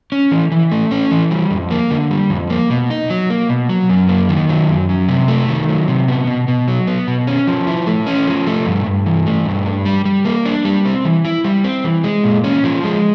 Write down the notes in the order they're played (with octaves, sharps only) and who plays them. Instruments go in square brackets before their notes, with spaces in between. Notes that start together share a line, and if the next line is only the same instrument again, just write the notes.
[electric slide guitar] C#4
E3
E3
A3
C#4
E3
G3
F2
A#3
D3
G3
F2
A#3
B2
D#4
F#3
A#3
B2
F#3
F#2
A#3
D#3
F#3
F#2
F#3
C3
A3
D#3
F#3
C3
B3
B2
B2
F#3
B3
B2
C#4
F3
E4
A3
C#4
F3
A3
G2
G2
E3
A3
G2
D4
G3
G3
A#3
D4
G3
C4
E3
E4
G3
C4
E3
G#3
A#2
C#4
F3
G#3